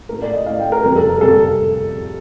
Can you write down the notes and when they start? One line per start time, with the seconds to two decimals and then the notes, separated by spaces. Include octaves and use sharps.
0.09 A2 A3 A#4
0.22 D5
0.34 D#5
0.46 A2 A3 F5
0.60 G5
0.72 A#4
0.84 F2 C3 G3 A#4
0.96 A4
1.09 A#4
1.21 C3 G3 A4